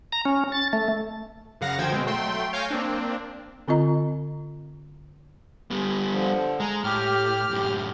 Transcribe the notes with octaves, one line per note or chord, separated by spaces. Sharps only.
A#5
C#4
A6
A3
F#2 C#3 F5 F#5 A#6
D2 F3 C5 G5 G#6
B2 G#3 C4
F#3 A3 G5 C6
C#5 F5 G#5 G6 A#6
A#3 C4 D4
D3 C4 F4 D#5 A#5
G3 B3
D3 F3
G#3 A#5
A2 G4 F6
F#2 A2